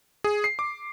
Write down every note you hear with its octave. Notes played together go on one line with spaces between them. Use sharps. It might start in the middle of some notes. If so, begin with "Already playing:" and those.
G#4
C7
D6